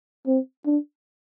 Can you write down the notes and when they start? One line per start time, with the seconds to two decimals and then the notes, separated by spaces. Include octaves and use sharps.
0.27 C4
0.66 D4